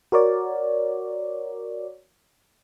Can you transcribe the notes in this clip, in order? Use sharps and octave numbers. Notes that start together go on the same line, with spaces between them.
F#4 A#4 C#5 D5